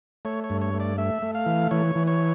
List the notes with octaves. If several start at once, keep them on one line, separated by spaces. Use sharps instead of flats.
A3 C#5
C#5
G2
C#5
A3
D5
A3 E5
A3
F5
E3
E3 C#5
E3
C#5